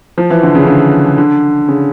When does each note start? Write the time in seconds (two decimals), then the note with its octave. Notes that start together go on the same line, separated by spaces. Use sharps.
0.18 F3
0.30 E3
0.43 D3
0.55 C#3
0.67 D3
1.18 D3
1.68 C#3